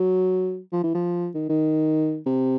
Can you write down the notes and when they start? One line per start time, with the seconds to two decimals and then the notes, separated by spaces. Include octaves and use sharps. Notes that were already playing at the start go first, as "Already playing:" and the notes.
Already playing: F#3
0.73 F3
0.83 E3
0.95 F3
1.34 D#3
1.49 D#3
2.26 C3